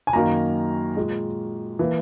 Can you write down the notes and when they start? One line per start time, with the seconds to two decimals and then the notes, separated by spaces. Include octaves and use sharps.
0.07 G#5
0.13 F#2 D#3 F#3 A#3 A#5
0.97 A#2 G#3
1.79 E3 A#3